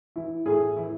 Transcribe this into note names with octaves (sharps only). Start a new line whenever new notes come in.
E3 E4
A2 G#4
E3 E4